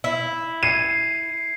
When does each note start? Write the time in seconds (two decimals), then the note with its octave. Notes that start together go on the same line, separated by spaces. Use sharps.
0.04 E4
0.63 G#6 C7 C#7 D#7